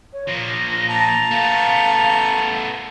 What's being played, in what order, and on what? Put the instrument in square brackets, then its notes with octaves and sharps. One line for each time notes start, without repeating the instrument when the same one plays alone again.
[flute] C#5
[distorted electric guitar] A#2 F3 [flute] A#6
[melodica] A5 A#5
[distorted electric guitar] A3 B3 [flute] F5